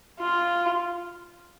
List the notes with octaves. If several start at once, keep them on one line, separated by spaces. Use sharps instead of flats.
F4